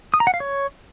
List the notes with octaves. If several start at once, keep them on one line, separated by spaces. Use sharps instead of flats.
D#6
A#5
F#5
F5
C#5